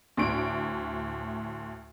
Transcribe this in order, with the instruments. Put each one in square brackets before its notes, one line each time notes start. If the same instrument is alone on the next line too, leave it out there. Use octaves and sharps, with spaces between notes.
[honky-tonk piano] D2 A2 D7